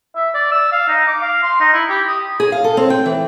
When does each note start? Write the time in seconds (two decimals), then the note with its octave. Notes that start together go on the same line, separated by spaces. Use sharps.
0.16 E5
0.35 D5
0.52 E6
0.72 F5
0.88 D#4
1.07 D6
1.22 F5
1.43 C6
1.60 D#4
1.73 E4
1.89 G4
2.08 D#6
2.40 G#4
2.52 F5
2.64 A4
2.77 C4
2.90 G5
3.06 E3